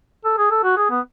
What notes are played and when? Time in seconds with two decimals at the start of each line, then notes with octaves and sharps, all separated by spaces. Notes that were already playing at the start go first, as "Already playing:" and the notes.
0.25 A4
0.38 G#4
0.51 A4
0.64 F#4
0.77 G#4
0.91 B3